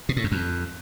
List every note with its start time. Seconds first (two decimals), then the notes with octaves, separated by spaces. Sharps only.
0.09 B2
0.16 A2
0.24 F#2
0.32 F2